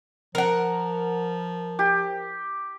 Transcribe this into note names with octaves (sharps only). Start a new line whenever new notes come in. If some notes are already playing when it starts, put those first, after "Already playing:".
F3 A#4 F#5
G4